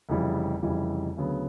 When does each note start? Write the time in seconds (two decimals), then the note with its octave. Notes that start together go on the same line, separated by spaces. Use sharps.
0.09 F1 F2 C#3 E3 G3
0.62 F1 F2 C#3 E3 G3
1.17 D2 C#3 F#3 B3